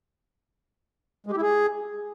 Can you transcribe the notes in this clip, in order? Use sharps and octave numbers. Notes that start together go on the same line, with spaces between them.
G#3
G4
E4
G#4